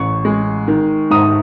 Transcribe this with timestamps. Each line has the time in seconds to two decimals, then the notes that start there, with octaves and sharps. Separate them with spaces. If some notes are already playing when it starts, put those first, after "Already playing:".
Already playing: A1 C#6
0.25 G#3
0.68 D#3
1.10 G#2 D#6